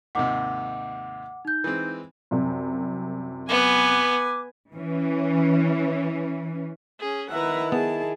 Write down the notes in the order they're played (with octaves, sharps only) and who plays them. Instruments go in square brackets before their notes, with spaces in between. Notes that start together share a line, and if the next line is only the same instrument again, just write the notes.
[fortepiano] D#2 G#2 C3 [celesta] F#5 D6
[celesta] D#4 G6
[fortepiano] E3 G#3 C4
[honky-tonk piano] C2 F#2 C3
[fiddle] B3 [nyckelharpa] B4 G#5 [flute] D6
[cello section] E3 C#4
[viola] C#4 G#4
[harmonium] D#3 E4 [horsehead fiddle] B4 E5 [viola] F#5 A#5
[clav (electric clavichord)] B3 [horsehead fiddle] G#4 [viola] A5